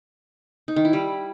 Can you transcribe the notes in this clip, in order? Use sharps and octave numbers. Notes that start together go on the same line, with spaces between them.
D#4
D#3
E4
G3